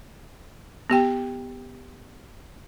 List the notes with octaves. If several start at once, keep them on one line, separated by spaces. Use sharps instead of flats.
B3 G4 G5